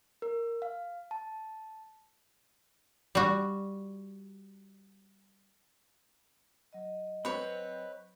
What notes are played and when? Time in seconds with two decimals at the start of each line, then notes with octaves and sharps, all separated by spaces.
0.22 A#4
0.62 F5
1.11 A5
3.15 G3 F#4
6.73 F#3 D#5
7.25 C4 B4 C#5 B5